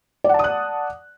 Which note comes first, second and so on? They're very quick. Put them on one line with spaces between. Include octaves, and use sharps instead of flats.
D5 F#5 A5 D#6 F#6